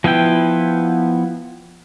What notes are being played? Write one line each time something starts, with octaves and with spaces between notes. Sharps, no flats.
F3 B3 E4 G5